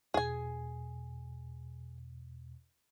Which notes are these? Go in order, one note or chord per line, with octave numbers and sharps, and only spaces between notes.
E2 B2 G#4 G#5